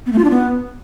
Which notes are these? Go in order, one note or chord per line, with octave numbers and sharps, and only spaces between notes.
B3
A3
F4
D4
B3